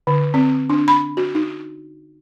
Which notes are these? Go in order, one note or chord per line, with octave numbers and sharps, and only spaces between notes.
D3
C4
D4
B5
F#4
D#4